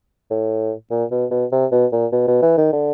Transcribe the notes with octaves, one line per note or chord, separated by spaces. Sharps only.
A2
A#2
B2
B2
C3
B2
A#2
B2
B2
E3
D#3
D3